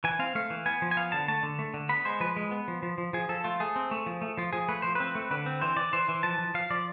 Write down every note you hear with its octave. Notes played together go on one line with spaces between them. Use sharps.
E3 G#5
C4 F5
A3 F5
E3
B3 G#5
F3
G#5
B3 F5
D3 A5
A3 A5
D3
A3
D3
B3 B5
G#3 C5
F3 B4
G#3
B3
F3
F3
F3
F3 G#4
F3 A4
A3 F4
A3 G#4
C4
A3
F3
A3
F3 F4
F3 G#4
A3 B4
F3 C5
C4 B4
A3
D3 B4
C4
E3 C5
E3 D5
E3 C5
E3
F3 A5
F3
F3 F5
F3 D5